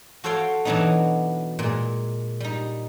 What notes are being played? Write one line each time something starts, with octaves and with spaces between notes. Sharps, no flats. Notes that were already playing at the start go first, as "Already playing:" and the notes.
F#4 A4 C5 C#5 F5 G5
B2 E3 F#3 B3 D4 D#4
A#2 G#3
G3 D#4